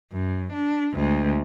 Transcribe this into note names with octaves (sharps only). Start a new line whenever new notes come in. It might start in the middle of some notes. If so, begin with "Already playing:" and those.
F#2
D4
D2 G#3